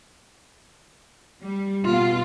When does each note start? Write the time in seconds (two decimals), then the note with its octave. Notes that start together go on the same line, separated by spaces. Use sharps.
1.43 G3
1.85 B2 F4